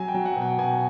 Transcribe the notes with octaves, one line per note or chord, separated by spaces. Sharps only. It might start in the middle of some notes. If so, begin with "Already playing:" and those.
Already playing: F#3 G#5
G5
F#3
F#5
B2
G5
B2 G#5